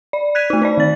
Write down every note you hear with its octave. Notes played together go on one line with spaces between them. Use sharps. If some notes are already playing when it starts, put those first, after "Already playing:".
D5
F#6 G#6 B6 D#7
A3 D#4
D#4 C5 D5
D#3 A6